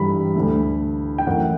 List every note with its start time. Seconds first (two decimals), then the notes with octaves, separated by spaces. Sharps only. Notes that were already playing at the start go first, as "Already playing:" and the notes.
Already playing: G2 E3 G3 B5
0.35 D2 D3 A3
1.18 G5
1.27 F#2 E3 A3 F#5